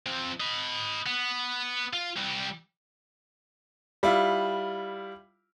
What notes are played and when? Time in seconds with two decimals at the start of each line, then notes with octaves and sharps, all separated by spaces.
0.07 F3 C4
0.40 D#5 B5
1.06 B3
1.93 F4
2.17 C2 G3
4.03 G3 E4 F4